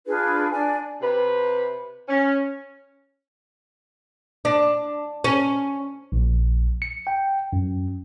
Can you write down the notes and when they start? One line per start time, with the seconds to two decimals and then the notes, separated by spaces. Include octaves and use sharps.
0.06 D4 F4 G#4 B4
0.51 D4 D5 G#5
1.02 C3 B4
2.09 C#4
4.45 D4
5.24 C#4
6.12 A#1
6.82 C#7
7.07 G5
7.53 F#2